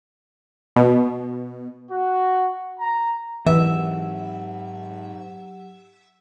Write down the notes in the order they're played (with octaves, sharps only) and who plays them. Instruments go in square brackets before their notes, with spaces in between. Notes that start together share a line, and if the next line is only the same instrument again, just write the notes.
[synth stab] B2
[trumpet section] F#4
A#5
[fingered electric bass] G#2 C4 [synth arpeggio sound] E3 [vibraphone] F#3 G4 F#5 [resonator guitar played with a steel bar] E5